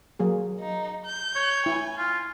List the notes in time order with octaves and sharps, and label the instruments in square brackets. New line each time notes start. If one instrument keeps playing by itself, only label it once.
[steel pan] F#3 A#3 G#4
[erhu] D#4
G6
[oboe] C#5
[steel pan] E4 [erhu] G#5
[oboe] F4